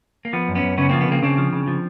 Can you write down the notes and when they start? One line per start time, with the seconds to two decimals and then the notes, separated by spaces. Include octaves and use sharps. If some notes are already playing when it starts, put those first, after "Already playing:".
0.25 A#3
0.33 F3 B3
0.48 F#2
0.55 B3 C#4
0.63 F#2
0.78 C#3 B3 C#4
0.89 F3 A#3 C4
1.01 B3
1.08 C#3 A#3 C4
1.23 C#3 C4 D4
1.38 F3
1.53 C#3
1.68 F3